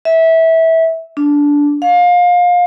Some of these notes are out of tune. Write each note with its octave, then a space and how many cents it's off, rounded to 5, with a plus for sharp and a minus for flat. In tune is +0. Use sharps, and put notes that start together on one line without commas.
E5 -20
D4 -15
F5 +25